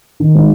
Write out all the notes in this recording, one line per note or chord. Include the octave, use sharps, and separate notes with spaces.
D#3
G#3 D#4